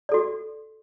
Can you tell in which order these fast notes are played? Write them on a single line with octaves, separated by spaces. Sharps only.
D5 A4 F#4